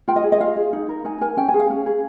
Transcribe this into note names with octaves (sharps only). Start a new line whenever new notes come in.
F4 G5
D#5
G#4
D#5
F4 F5
G#4
D#4
A#4
D#4 G#5
A#4 G#5
C#4 G5
G#5
G#4
F5
C#4
G#4